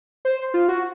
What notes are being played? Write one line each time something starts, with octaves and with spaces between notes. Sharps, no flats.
C5
F4
F#4